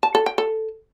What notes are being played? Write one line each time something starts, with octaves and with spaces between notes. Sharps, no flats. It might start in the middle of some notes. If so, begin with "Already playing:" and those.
A5
A4
G5
A4